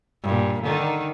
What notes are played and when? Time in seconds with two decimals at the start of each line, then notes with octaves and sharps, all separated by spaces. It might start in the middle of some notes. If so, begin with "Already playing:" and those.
0.23 G2 A#2
0.62 D3 D#3 D#4